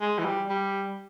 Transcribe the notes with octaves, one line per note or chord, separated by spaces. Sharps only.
G#3
E3
G3
G3